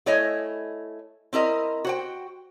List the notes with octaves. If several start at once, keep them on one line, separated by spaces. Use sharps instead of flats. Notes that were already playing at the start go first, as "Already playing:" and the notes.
A3 E4 C#5 D#5 G#5
C4 E4 A#4 D#5
F#4 C5 G5